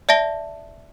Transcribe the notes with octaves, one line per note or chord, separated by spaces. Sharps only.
D5 E5 A5 A#6 G7